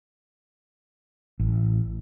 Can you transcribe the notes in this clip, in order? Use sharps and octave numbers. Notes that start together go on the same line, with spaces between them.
A1